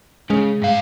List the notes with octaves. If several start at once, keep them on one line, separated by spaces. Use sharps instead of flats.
C#3 G#3
G#2 F5